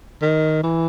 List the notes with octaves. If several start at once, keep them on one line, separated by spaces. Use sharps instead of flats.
D#3
E3